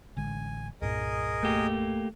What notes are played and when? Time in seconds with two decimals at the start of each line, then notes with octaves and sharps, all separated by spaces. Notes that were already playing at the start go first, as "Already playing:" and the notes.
0.17 A1 D3 G#3 G#5
0.82 C2 G2 A#2 G#4 A#4 D#5
1.43 A3 A#3 G4